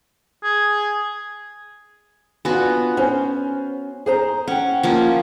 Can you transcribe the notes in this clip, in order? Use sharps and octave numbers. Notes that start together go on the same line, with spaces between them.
G#4
B3 D4 F4 F#4 G#5
C#4 C5
G#4 C5 A#5
C#4 F#5 G5
F3 A#3 C#4